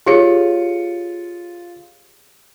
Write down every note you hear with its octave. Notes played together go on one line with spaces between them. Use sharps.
F4 G4 G#4 C#5 C#7